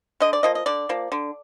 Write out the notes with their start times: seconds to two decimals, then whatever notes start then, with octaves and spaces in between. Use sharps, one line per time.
0.20 D3 D#5
0.33 D5
0.43 F3 A#3 D#5
0.55 D#5
0.66 D3 D5
0.89 F3 A#3
1.12 D3